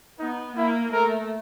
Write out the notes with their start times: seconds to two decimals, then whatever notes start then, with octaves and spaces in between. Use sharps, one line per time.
0.19 B3 D#4
0.56 A#3 E4
0.92 A3 A#4